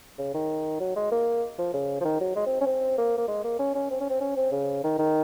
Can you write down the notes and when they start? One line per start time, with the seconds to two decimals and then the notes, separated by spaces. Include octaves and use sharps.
0.18 C#3
0.34 D#3
0.80 F#3
0.96 G#3
1.12 A#3
1.58 F3
1.74 C#3
2.01 F3
2.05 D#3
2.21 F#3
2.36 G#3
2.46 C4
2.61 C#4
2.66 C4
2.98 A#3
3.18 A#3
3.28 G#3
3.44 A#3
3.59 C#4
3.75 C#4
3.91 C4
4.01 C#4
4.10 C4
4.21 C#4
4.37 C4
4.52 C#3
4.84 D#3
4.99 D#3